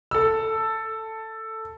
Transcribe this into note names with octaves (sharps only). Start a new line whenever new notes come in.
A4 E6